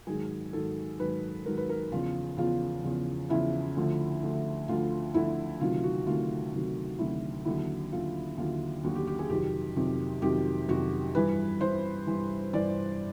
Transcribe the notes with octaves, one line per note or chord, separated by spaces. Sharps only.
G#2 D#3 F#3 G#4
G#2 D#3 F#3 A4
G#2 D#3 F#3 B4
G#2 D#3 F#3 A#4
B4
A#4
E2 C#3 F3 F4
E2 C#3 F3 F4
E2 C#3 F3
E2 C#3 F3 E4
D2 D3 F3
D2 D3 F3
D2 D3 F3 F4
D2 D3 F3 E4
D2 C3 D#3 F#3 F4
F#4
D2 C3 D#3 F#3 F4
D2 C3 D#3 F#3
D2 C3 D#3 F#3 E4
D#2 D3 F#3 E4
D#2 D3 F#3 F4
D#2 D3 F#3 F4
D#2 D3 F#3 F#4
G4
G4
G#4
F2 C3 D#3 F#3 G4
F2 C3 D#3 F#3
F2 C3 D#3 F#3 G4
F2 C3 D#3 F#3 F#4
G2 E3 B4
G2 E3 C5
G2 E3
G2 E3 D5